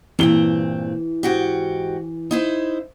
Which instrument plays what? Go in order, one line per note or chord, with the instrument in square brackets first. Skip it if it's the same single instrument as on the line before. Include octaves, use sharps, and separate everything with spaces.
[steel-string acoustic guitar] G2 A#2 C4 [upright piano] E3 G7
[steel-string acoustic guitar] G#2 F#4 G4
D#4 E4 C5